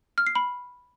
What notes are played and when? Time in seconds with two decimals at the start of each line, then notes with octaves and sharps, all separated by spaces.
0.18 F6
0.27 C7
0.35 B5